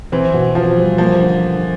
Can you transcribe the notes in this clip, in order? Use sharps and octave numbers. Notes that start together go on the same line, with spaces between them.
E3 C4
B2
F3 F4
G3
F3 A#3
D3
D3